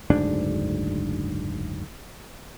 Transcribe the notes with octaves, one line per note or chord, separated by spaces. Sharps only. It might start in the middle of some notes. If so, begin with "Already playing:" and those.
F#1 D2 G#2 D4